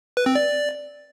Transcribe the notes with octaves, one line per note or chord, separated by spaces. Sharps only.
B4
C4
D5